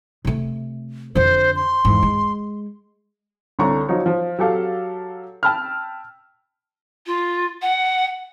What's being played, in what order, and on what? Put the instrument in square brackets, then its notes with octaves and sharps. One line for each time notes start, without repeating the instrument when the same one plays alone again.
[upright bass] C3 A3
[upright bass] F2 D3 [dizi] C5
[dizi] C6
[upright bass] E2 G#2
G#3
[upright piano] C2 D3 C#5 A#5 C#6
F3 F#3 D#4 C#5
F3
F#3 G4 A4 F5
G5 A5 B5 E6 F6
[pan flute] F4
F#5